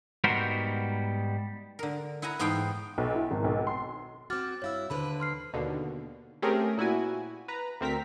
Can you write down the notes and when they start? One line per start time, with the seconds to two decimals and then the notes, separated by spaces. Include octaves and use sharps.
0.24 G#2 G3 B3 F#4 A#4 C5
1.79 D3 A#4
2.22 E4 F#5 G#5 A#5
2.39 E2 G#2 B3 A4 F5 G5
2.98 B1
3.15 E4
3.31 G#1
3.44 B1
3.67 C6
4.30 C4 F#4 D6 F6 A6
4.62 G2 E4 F#4 C#5 F5 E6
4.90 D#2 D3 B4 C5 B5
5.20 C6 F6 C7
5.53 D#2 B2 D3
6.42 A3 C4 C#4 G4 G#4 A#4
6.77 A#2 E4 F#4 G#5
7.48 B4 A#5
7.81 D2 C4 A#4 A#5 B6